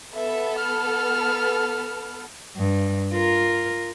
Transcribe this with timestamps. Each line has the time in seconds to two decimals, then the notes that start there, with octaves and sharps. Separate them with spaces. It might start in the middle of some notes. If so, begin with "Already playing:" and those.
0.14 B3 A4 E5
0.59 F6
2.57 G2
3.13 F4 A#4